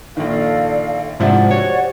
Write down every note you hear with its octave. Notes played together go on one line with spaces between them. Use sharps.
A#1 D#3 A4 D5 F5
G#2 C3 F3 D4 E4 C5 D5 F#5
F#4 G4 C#5